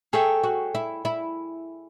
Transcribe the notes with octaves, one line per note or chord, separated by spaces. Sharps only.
G#4 A4 C#5 E5 G5
F#4
E4
E4